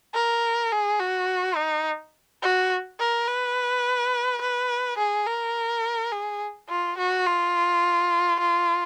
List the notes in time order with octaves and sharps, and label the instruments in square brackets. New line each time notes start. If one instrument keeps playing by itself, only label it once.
[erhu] A#4
G#4
F#4
D#4
F#4
A#4
B4
B4
G#4
A#4
G#4
F4
F#4
F4
F4